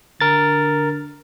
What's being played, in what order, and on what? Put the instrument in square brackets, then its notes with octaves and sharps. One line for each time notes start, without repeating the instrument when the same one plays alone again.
[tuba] D3 [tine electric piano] A#4 A6